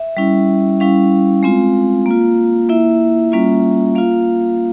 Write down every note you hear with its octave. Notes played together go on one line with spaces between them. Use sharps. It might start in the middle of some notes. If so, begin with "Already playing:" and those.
Already playing: E5
G3 C#4 E4
G3 C#4 E4 F5
G#3 C4 F4
A#3 F4
A#3 E4 E5
G3 A#3 C#4 F4
A#3 F4 F5